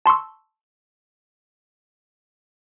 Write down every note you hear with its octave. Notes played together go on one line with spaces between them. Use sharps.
A5 C6 C#6 E6